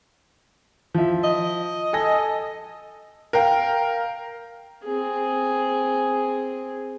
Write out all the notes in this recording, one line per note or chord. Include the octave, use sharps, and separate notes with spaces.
F3 E5
D#5
A4 G#5 A#6
A#4 F5 G5
C4 G#4